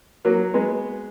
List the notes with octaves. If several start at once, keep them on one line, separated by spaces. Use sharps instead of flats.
F#3 A#3
G#3 B3